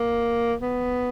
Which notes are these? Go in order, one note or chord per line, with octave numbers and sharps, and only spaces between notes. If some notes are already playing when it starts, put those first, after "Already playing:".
Already playing: A#3
B3